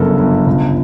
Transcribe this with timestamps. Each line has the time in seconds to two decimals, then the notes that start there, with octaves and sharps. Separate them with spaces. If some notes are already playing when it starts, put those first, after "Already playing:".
Already playing: G1 F#2 C#3 A4 A#4
0.17 G1
0.47 C#2